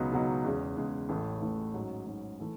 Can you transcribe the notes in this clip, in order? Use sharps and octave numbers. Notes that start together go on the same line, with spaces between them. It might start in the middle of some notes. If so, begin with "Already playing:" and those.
Already playing: C#2 B2 F#3 B3 D#4
C#2 B2 F#3 B3 D#4
E2 C#3 G#3
E2 C#3 G#3
A1 A2 E3 A3
A1 A2 E3 A3
G#2 F#3 C#4
G#2 F#3 C#4
E3 A3